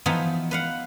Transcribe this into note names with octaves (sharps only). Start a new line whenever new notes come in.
E3 F3 B3 D#4 F4
B4 F5 F#5